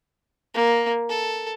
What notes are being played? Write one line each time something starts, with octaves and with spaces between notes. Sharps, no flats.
A#3
A4